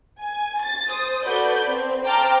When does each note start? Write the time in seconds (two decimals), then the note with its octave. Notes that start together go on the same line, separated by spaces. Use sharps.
0.20 G#5
0.62 A6
0.92 C5 D#6
1.25 F#4 A4 B4 D5 G6
1.66 C4
2.04 C5 G5 A5 A#5 D6 F6